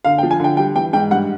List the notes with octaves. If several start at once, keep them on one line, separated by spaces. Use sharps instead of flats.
D3 F5
G5
F3
G#5
D3 G5
G3 G5
E3 G5
G#2 G5
G2 F#5